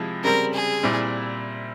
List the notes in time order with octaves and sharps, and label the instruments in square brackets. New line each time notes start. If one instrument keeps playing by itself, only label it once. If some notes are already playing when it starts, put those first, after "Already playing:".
Already playing: [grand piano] C3 F3 G#3 E4
[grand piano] C#3 G3 C4 [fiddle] A#4
[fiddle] G#4
[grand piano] A#2 G3 C4 E4